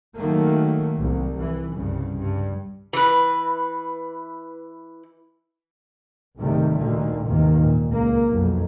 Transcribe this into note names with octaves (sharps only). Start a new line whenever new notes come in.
D#3 F#3 A3 A#3
C2
E3
C2 G2 C#3
G2
E3 B4
C2 G#2 C3 D#3 G3 A3
D2 A#2 D3 D#3
D#2 G#2 C3 D#3 E3 A#3
A#2
C#2 A#3
B1 F2 F#3